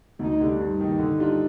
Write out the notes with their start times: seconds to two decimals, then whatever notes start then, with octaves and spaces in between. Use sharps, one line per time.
0.19 D2 D#4
0.40 D3 G3 D4
0.59 G2 D#4
0.79 D#3 A#3
0.99 D3
1.19 G3 D4 F4